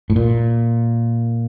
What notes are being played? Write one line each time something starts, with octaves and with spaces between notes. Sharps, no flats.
A2
A#2